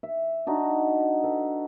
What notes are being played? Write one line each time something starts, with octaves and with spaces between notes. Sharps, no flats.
E5
D4 D#4 F#4 D#5
A4 B4